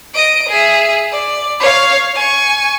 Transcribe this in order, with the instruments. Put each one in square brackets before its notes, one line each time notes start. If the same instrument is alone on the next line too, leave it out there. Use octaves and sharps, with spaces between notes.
[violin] D#5 D7
G#4 E5
D5
C#5 F5
G#5 C#6